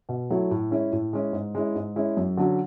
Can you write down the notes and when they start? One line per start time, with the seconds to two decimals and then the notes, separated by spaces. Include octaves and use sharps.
0.09 B2
0.30 F#3 A3 E4
0.51 A2
0.71 G#3 C#4 E4
0.93 A2
1.13 G#3 C#4 E4
1.33 G#2
1.55 G#3 C#4 E4
1.75 G#2
1.96 G#3 C#4 E4
2.17 F#2
2.37 D3 F#3 C#4